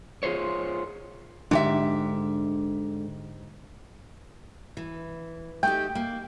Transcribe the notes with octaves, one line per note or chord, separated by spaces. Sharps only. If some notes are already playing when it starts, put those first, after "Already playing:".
F4 G#4 C5 C#5
G#2 D3 G#3 D4 G4 E5
E3
A3 D#4 G4 G5
A#3